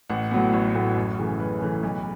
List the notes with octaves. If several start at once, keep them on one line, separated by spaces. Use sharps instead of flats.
A1 F#5
A2 F#3 B3
A1 C#5
A2 F#3 B3
F#2
C#3 E3 A3
F#2 B4
C#3 E3 A3
B1